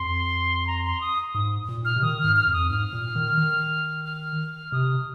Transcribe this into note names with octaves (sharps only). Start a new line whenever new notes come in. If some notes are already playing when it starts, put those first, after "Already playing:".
Already playing: F2 C6
A#5
C6
D#6
G#2 D#6
A#2
F6
C3
D#3 D#6
F6
G#2
F6
F2
D#6
G#2 F6
A#2
D#3
D#3
F6
C3 D#6